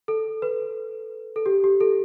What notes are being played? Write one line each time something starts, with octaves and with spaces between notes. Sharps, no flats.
A4
B4
A4
G4
G4
A4